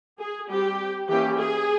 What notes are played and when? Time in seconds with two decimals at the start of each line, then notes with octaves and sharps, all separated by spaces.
0.19 G#4
0.48 G3 C4 G4
1.08 E3 A#3 C#4 G4
1.38 G#4